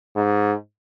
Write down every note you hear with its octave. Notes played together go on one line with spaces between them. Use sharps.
G#2